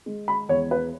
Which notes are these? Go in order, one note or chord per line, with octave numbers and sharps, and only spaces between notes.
G#3
B5
E2 C#5
B4